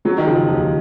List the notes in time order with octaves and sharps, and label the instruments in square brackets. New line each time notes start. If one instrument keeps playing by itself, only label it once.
[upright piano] F#3 [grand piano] G#3
[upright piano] D#3
[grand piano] C#3 [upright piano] F3
[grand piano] D#2 [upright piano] F3